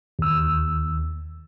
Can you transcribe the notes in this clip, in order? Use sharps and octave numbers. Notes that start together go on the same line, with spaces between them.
D#2 E6